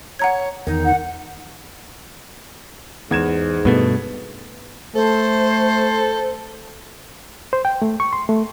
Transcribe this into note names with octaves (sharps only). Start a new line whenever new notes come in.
C#5 F#5 A#5 G#6
E2 D#3 D#4
F#5
E2 G#2 G#6 E7
G2 B2 A3 B3
A3 A4 C5
C5
G5
A3
C#6
C6
A3